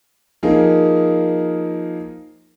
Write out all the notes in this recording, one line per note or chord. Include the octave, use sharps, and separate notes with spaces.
F3 A#3 D#4 G#4 A#4